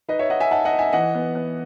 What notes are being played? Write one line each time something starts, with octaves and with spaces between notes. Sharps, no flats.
D#4 B4 D#5
C#5 E5
D#4 D#5 F#5
E5 G#5
D#4 F#5 A5
D#5 F#5
D#4
E5 G#5
E3 D#5 F#5
B3
B3